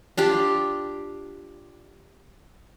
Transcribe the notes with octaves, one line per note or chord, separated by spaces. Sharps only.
D4 F4 G4